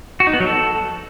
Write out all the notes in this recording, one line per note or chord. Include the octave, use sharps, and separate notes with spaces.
F#4
D#4
B3
F#3
A4